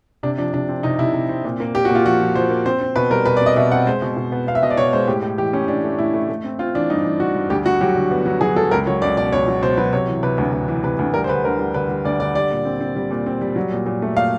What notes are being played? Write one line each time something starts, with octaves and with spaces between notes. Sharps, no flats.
C3 D4
F3 D4
C3 D4
C4
C3 D#4
C3 E4
C3
C4
A#2
A#3
A#3 G4
A#2 F#4
F4
F3 F#4
F3
F3 C5
A#3
C4 C5
C4
B2 B4
G3 A#4
B2 B4
D5
C4 D#5
B2 E5
C4 F#5
G#3 C5
B2
B2
B3
B3 F5
E5
B2 D#5
D5
B2 C#5
G#3 C5
A2 G4
A2
E3 G4
A2 C#4
E3 D4
A3
A2 E4
A3
A3
C4
C4 F4
E3 D4
G2 D#4
E3
E3 F#4
G2
D2 G4
D2 F#4
F#3 G4
D3
B3
F#3
F#3 G#4
F#3 A4
C#2 A#4
F#3 C#5
C#2 D5
B2 D5
C#2 C#5
F#3
B2 C5
F#3 B4
C3 C#5
E3
C3 B4
D2
D2
E3
C3 B4
D2
G3 A#4
C5
D3 B4
D2 A#4
G3
D3 B4
G3
D2 D5
D3 D5
G3 D5
A#2
C4
C4
G3
A#2
C4
G3
F#3
A#2
A#2
A3
A#2 F5